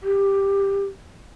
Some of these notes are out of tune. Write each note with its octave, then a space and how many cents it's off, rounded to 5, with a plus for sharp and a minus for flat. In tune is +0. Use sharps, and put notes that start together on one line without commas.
G4 +10